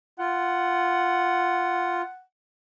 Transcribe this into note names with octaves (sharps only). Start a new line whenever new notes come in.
F4 F#5